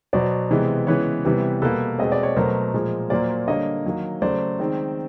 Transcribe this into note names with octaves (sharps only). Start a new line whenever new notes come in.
B2 F#3 B3 C5 D5
C3 E3 G#3 B3
C#3 E3 G#3 B3 B4 C#5
C3 E3 G3 B3
B2 G3 A#3 A4 B4
B2 G#3 C4 D#5
D5
C#5
B2 F#3 A3 A#4 C5
A#2 F3 G#3
A#2 F#3 A#3 C5 D5
D3 G3 A#3 C#5 D#5
D#3 F#3 A#3
C#3 F#3 A3 C5 D5
D#3 G#3 C4